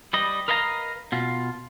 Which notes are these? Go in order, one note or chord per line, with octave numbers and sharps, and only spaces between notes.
G3 B4 D#5
A#4 B4 D#5 F5 A5 A#5
B2 F4